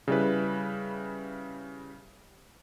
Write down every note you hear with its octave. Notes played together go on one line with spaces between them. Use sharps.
C#3 G3 E4 B4